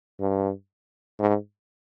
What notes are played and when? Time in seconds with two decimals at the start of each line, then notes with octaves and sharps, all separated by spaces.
0.20 G2
1.20 G#2